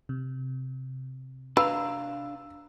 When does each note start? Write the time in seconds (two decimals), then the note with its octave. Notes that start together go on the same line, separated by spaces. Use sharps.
0.09 C3
1.57 D4 B4 F5 A#5 E6